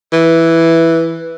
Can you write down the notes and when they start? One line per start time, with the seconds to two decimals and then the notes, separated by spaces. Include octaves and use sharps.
0.13 E3